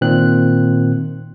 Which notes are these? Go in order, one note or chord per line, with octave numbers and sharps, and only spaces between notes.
A#2 D#3 C4 F#6